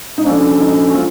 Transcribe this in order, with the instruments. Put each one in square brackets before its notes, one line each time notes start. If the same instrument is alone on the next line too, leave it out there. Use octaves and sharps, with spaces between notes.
[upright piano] D#4
[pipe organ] F3 A#3 C#4 F#4 A4 [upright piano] D4
[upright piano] D#4
F4